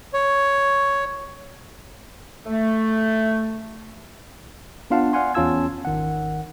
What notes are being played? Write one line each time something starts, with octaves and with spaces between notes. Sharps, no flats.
C#5
A3
B3 D4 F4 F5 F#5 A5
D5 F5 F#5 G#5 C6
E2 C#4 F4 A5 E6 G#6
G#1 D#3 F#5